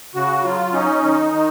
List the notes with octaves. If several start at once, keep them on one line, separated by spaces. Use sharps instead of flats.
C#3 F#4
F#3 F4
C#4 D#4
D#3
D#3